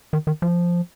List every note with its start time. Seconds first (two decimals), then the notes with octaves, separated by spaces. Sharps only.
0.13 D#3
0.27 D#3
0.42 F3